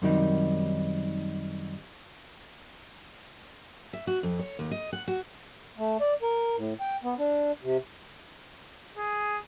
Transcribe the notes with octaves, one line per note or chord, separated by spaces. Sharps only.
F#2 C3 D#3 F#3 G3 D#4
E5
F#4
F2
C#5
D#2
D#5
F#5
F#4
A3
D5
A#4
A2
G5
B3
D4
C3
G#4